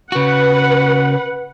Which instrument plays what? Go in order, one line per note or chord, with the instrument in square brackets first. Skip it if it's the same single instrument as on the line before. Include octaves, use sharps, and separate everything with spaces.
[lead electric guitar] C#3 F#4 [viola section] B4 F#5